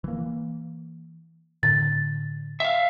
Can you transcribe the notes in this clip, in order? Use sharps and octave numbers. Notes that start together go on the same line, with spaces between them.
E3 A#3
A2 D3 A6
E5 F5